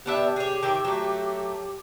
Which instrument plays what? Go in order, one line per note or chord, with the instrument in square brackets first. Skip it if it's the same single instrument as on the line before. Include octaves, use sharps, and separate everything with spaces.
[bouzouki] B3 D4 E5 [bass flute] G4
[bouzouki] G#4 C#5
D#3 E5 G5
F#3 A3